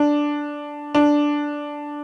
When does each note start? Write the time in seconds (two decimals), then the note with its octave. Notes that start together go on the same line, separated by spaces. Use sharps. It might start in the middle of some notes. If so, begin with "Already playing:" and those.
Already playing: D4
0.95 D4